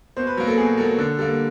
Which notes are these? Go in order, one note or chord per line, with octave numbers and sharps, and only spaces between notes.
B2 C5
B4
F#3 A#3 A#4
A4
B2 G#4
F#3 A#3 A4
D3 A4
G3 A#3 A4